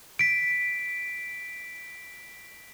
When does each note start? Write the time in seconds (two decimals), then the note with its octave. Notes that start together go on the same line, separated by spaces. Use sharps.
0.19 B6 D7